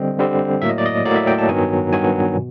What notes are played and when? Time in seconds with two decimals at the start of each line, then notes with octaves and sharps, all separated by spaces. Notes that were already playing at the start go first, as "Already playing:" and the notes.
Already playing: D3 G3 C4 D#5
0.19 D3 G3 C4
0.62 A2 F#3 A#3 E5
0.69 D#5
0.78 D5
0.86 D#5
1.05 A2 F#3 A#3 D5
1.16 E5
1.27 G5
1.38 A5
1.49 G2 D#3 F#3 B3 G#5
1.92 G2 D#3 F#3 B3 G#5
2.36 B2